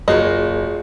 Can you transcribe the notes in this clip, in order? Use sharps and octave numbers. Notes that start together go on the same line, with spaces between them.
F#1 A#3 F4 F#4 G#4 C#5 D#5